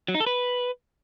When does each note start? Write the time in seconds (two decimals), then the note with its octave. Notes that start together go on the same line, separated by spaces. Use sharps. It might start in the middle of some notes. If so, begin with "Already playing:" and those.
0.08 F#3
0.14 D#4
0.20 A4
0.26 B4